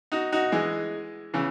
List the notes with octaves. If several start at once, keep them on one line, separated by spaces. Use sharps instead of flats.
D#4 F#4
D#4 F#4
E3 G#3
C#3 E3